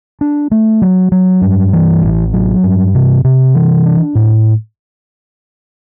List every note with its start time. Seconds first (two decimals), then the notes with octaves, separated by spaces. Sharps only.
0.21 D4
0.51 A3
0.82 F#3
1.12 F#3
1.42 G2
1.73 E3
2.03 A1
2.33 F#3
2.63 G2
2.95 C3
3.24 C3
3.55 E3
3.86 D4
4.15 A2